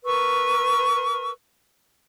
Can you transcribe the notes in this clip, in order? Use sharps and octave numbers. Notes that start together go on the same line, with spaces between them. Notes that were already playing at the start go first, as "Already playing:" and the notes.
A#4 B4 C#6 E6